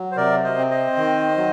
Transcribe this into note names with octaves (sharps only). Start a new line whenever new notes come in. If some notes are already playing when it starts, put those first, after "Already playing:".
Already playing: F#3
C5
C3 A#4 D5
C5 D#5
C4
C5 D#5
D#3
F#3